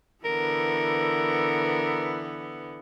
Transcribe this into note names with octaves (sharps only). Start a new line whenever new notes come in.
D3 E3 B3 A#4